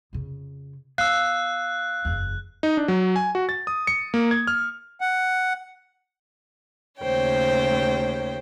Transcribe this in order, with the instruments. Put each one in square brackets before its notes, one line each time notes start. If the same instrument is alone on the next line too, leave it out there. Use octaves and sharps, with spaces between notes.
[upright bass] F2 C#3
[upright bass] B3 [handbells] F5 E6 [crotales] F#6
[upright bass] F#1 E2
[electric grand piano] D#4
D4
F#3
G#5
F#4
A6
D#6
C#7
A#3
G#6
F6
[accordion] F#5
[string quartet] D#2 C#3 A3 C5 C#5 G5